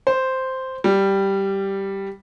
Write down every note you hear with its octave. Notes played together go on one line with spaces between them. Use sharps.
C5
G3